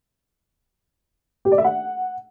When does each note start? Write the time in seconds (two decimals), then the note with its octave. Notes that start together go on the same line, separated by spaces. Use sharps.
1.45 G4
1.52 D5
1.58 E5
1.64 F#5